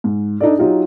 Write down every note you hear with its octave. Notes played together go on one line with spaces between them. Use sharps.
G#2
D4 D#4 A4 D5
F#3 D#4 F4 G4